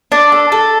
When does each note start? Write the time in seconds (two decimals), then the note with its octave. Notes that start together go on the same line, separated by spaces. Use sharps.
0.12 D4
0.32 A4
0.52 A4